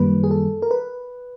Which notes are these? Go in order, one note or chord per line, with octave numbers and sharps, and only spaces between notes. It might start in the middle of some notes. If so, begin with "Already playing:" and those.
Already playing: F#2 D#3 G3 A#3 B4
G#4
A4
A#4
B4